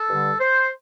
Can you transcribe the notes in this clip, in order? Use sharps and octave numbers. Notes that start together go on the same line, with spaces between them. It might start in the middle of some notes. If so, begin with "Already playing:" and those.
Already playing: A4
G2 D3 G3
C5